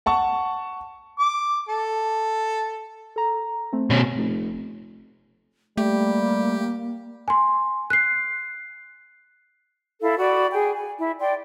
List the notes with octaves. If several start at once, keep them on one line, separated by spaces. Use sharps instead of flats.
F#5 A5 C#6
D6
A4
A4 A#5
A3 C4
B2 C#4
F1
G3 A3 A#3 G4
G#5 C6
F#6 C7
E4 A4 F5
F#4 D5 B5
G#4 G5
G#5
E4
D5 G5 C6